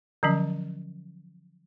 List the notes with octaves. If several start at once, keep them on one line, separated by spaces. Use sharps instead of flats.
D3 F3 F#3 C#4